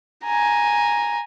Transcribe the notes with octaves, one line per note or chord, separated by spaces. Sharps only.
G#5 A#5